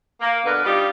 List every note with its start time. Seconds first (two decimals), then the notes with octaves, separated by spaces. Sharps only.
0.21 A#3
0.44 B2 D3 A#4 B4
0.65 G3 D4 D#4 F4 G4